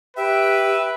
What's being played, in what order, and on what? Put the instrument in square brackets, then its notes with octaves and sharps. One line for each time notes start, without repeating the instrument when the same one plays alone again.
[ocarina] G4 [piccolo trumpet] B4 [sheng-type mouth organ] E5 [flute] G5